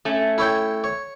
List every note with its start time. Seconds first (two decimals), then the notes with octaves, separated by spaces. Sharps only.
0.05 A3 C#4
0.38 E4 C#5 G5
0.84 C#5